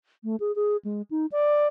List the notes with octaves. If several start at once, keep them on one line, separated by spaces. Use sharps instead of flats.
A3
G#4
G#4
G#3
D#4
D5